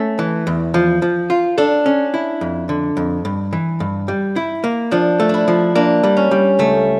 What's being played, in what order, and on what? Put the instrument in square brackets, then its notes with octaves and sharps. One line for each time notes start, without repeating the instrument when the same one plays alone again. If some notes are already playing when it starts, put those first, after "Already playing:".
Already playing: [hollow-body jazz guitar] A3 C#4
E3
E2
F3
F3
F4
[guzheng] D4 [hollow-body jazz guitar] A4
[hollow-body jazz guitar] C#4
E4
F2
D3
F2
G2
E3
G2
G3
E4
A#3
[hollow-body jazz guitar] F3 [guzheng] D4
[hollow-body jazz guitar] A3
[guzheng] D4 E4
[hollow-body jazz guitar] F3
[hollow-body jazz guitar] A#3 [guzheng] D4
[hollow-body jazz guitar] G3
[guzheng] C#4
[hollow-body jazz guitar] G3
[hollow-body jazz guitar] C#2 [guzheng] A3